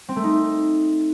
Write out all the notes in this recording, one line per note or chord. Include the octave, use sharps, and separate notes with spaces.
C4
A3
D#4